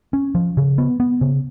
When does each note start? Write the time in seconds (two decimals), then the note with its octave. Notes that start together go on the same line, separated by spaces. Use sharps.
0.13 C#4
0.35 F3
0.57 C#3
0.78 B3
1.00 B3
1.21 C#3